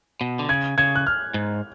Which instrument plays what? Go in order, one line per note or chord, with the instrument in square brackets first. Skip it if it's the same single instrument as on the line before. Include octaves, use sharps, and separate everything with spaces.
[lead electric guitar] B2
D3
[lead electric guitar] C#3 [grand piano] G#6
[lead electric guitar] C#3 [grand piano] G#6
[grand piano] F#6
F6
[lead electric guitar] G#2